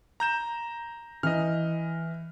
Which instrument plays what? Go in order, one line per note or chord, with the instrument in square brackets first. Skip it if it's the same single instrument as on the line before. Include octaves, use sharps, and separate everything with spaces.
[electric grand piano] A#5 G6 E7
[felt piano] E3 [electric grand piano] D#5 F6